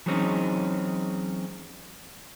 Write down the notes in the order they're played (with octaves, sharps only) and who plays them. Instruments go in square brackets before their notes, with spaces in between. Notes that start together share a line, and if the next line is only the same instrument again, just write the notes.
[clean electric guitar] E3 F#3 G#3 C4 C#4 D#4